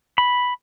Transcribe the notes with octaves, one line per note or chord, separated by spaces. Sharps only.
B5